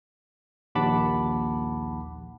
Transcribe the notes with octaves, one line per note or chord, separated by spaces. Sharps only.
A#1 D#2 F#5 A5 B5 D6